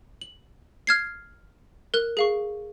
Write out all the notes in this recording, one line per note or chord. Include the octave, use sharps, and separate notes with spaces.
F#7
F6 G#6 C7
A#4 F#6
G#4 F5 C#6